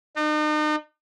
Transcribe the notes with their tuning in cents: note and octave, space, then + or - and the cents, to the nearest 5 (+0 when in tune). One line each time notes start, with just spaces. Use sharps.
D#4 -40